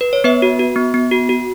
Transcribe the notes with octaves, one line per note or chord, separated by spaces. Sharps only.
B4
C#5
B3 B4 E5
F#4
F#4
B3
B3
F#4
F#4